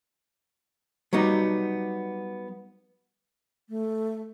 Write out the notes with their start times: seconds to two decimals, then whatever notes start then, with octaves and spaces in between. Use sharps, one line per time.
1.13 F#3 G3 B3 D#4
3.69 A3